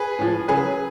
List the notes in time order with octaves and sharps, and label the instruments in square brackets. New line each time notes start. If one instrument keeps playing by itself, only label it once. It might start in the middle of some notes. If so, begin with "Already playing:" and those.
Already playing: [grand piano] G#4 B4
A2 F3
C#3 F#3 G#4 B4